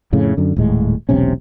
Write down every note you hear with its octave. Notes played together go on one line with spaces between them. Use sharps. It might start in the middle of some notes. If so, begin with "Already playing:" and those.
F2 A2 C#3
F#2 D3
D#1 A2 G#3
E1 B1 C3 C#4